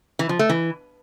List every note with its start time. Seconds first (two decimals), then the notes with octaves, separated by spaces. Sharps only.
0.19 E3
0.29 F3
0.39 A3
0.49 E3